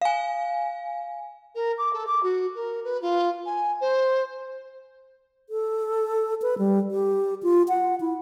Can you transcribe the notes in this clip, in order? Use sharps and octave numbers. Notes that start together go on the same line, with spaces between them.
F5 G#5
A#4
D6
A4
D6
F#4
A#4
B4
F4
G#5
C5
A4
B4
G3
G4
F4
F#5
E4